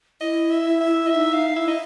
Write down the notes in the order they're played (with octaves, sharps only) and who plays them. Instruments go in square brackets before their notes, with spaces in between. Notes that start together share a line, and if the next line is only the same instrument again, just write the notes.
[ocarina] E4 [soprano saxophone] D#5
[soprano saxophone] E5
E5
D#5
[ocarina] E4 [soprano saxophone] E5
[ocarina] D#4
[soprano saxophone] F5
[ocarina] E4 [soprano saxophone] E5
[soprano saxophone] D#5